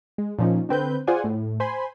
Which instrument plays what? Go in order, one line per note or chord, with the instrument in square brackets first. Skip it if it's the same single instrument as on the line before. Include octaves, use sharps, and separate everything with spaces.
[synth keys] G#3
A#2 F3 C#4 D#4
D3 C4 B4 G6
F4 G#4 C5 D5 F#5 G#5
A2
C5 G#5 B5 C6